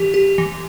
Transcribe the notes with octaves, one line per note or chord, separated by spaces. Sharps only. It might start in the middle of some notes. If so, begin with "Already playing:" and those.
Already playing: E3 G4
G4
E3